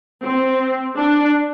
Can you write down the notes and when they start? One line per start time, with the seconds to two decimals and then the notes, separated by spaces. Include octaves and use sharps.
0.22 C4
0.98 D4